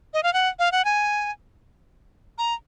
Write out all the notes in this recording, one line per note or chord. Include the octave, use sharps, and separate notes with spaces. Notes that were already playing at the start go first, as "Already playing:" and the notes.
D#5
F5
F#5
F5
F#5
G#5
A#5